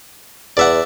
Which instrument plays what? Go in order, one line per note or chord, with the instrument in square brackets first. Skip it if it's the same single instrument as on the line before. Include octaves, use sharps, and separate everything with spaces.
[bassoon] E2 [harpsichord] D5 E5 F#5